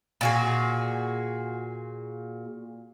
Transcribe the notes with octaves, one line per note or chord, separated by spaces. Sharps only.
A#2 F#4 G#4